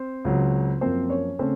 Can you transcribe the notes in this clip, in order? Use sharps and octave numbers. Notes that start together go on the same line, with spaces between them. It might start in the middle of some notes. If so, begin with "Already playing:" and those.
Already playing: C4 C5
C#2 C#3 F#3
F#2 F3 A#3 C4 C5
C#4 C#5
C#3 A3 C4 C#4 C5